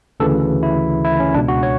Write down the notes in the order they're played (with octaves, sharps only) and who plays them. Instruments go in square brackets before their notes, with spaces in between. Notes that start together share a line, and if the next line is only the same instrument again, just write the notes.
[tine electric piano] D2 C#3 E3 A4
E4
E4
C#4
C#2 D4
B2
F#4
C#5